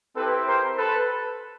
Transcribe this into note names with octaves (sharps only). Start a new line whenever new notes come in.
C4 E4 G4 A4 B4
A#4 C5
A4 B4